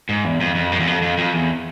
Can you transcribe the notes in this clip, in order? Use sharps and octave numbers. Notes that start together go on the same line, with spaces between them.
G#2
E2
F2
F2
F#2
E2
F2
F2
F2
E2